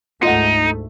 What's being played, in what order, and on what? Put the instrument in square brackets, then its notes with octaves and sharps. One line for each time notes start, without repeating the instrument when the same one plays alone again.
[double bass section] D2 G#2 A3 [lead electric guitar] D#4 [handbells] F4 D#5 F#5